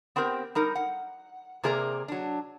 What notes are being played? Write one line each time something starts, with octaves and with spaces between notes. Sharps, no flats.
B3 C4 G4 A#4
G3 D#4 A#4
F#5
C3 A#3 G#4 A#4 D5 A#5
F#3 D4